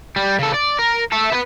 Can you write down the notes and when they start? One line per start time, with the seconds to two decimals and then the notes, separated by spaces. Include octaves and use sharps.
0.16 G3
0.39 C#3 A4
0.54 D5
0.79 A#4
1.12 A4 E5
1.32 B3 B4